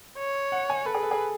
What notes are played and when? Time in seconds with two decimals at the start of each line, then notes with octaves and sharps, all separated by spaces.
0.19 C#5
0.52 F#5
0.70 G#5
0.85 A4 B4
0.94 G#4
1.03 A4
1.11 G#4